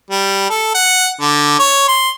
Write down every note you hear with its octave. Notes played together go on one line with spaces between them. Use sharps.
G3
A4
F#5
D3
C#5
C6